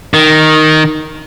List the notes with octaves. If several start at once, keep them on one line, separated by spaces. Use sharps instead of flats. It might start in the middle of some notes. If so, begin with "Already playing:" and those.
D#3